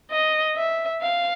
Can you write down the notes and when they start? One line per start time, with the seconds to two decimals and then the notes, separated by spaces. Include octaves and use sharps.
0.11 D#5
0.56 E5
1.02 F5